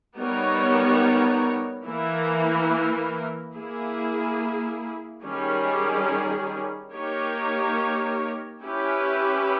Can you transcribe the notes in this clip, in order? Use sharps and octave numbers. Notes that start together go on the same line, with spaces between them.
G3 B3 D#4 A#4 C#5
E3 A#3 E4 A#4
A#3 E4 G#4
D#3 G3 C#4 G#4
A#3 D#4 G4 A#4 C#5
C#4 E4 G4 B4